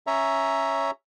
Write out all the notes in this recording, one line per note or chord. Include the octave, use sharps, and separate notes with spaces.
C#4 C#5 E5 A#5